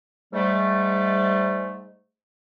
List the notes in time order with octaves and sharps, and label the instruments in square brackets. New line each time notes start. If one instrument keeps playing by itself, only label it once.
[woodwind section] G#2 G3 A3